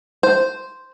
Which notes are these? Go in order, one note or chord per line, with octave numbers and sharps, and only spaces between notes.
C5